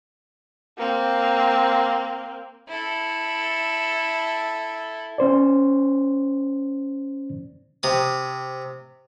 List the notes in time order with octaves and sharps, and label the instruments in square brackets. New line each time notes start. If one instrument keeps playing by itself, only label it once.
[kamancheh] A#3 C4
[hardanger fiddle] E4 A4
[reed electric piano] C#4 C5 D5
[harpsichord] C3 D#6